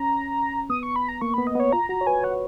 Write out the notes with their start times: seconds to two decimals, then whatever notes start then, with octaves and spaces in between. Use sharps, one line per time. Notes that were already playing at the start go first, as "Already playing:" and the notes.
Already playing: C#4 A#5
0.70 B3 D#6
0.83 C#6
0.96 B5
1.08 A#5
1.21 A#3 C#6
1.34 B3 B5
1.47 D#5
1.55 B3
1.60 C#5
1.73 F4 A#5
1.89 F#4 A#5
2.01 C#5
2.07 B4 G#5
2.23 C#5 F#5